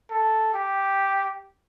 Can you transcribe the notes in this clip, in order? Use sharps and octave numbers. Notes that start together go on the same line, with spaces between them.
A4
G4